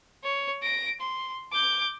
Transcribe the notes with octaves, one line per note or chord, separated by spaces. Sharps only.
C#5
A#6 D7
C6
D6 G6